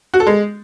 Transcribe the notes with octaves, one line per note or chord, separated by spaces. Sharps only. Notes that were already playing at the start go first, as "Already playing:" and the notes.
F#4
A4
G#3